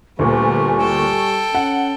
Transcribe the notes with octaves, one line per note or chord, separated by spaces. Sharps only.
D2 A#2 G3 A3 B3 G#5 C#6
A4 G5
C#4 F#5